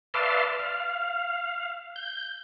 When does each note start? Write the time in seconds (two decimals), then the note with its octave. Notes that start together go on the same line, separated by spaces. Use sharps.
0.14 B4 D5 E5 F5 A5 C6
0.59 F5
1.96 G6